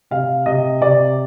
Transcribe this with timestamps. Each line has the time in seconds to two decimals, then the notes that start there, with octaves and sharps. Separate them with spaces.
0.11 C3 F5
0.46 C3 D#5
0.81 C3 D5